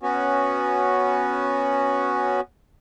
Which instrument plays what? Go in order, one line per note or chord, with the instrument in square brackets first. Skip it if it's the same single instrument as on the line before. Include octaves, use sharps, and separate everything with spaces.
[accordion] B3 C#4 F#4